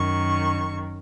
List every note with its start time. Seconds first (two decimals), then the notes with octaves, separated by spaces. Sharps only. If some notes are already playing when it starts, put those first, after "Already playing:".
Already playing: F#2 D#3 C#6